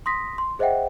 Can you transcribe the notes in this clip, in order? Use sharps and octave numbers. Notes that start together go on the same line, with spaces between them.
C6 D#6 A#6 B6
C6
G#4 C5 D#5 E5 F#5 G5